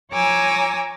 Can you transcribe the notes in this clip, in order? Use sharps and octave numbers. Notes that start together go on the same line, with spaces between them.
F3 C#5 G#5 A#5 D6 E6